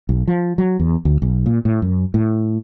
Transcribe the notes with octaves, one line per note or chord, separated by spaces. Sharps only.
B1
F3
F#3
E2
D2
B1
A#2
A2
F#2
A2